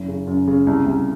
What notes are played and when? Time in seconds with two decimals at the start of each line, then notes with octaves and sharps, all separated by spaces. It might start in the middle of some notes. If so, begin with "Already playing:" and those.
Already playing: F#1
0.08 C#3
0.27 F#2
0.48 C#3
0.67 C2
0.86 C2